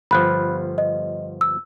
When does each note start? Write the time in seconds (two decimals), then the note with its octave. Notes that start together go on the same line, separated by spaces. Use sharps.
0.11 G1 F3 B5 F#6
0.78 D#5
1.41 E6